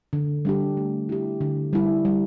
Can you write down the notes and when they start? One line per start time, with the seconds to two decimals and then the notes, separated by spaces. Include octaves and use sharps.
0.13 D3
0.45 G3 D4 G4
0.77 A3
1.09 E4 G4
1.41 D3
1.73 G3 E4
2.05 G3